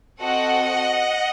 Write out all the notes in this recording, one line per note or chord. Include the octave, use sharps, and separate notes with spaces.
C4 F#4 A4 D#5 F#5